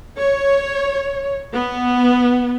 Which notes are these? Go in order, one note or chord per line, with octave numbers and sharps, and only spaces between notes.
C#5
B3